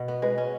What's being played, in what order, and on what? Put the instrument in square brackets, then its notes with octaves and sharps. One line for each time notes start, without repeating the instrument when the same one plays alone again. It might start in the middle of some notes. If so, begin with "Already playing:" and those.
Already playing: [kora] B2 F#4
B3
[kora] G#3 [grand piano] B4
[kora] C#4